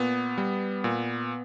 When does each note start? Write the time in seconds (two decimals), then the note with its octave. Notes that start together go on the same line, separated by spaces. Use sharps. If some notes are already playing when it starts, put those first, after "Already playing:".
Already playing: A#2 B3
0.38 G3
0.84 A#2